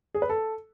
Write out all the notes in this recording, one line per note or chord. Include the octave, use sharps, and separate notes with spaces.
G#4
B4
A4